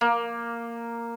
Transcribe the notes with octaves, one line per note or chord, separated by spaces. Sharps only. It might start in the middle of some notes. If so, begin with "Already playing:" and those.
A#3